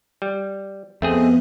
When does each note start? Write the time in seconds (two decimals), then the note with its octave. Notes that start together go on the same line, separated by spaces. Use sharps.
0.22 G3
1.02 F2 A3 B3 C4 G#4 B4 D#5